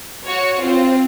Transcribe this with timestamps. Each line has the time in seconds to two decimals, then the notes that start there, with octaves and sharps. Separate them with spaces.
0.24 F#4 C#5
0.60 C4 F4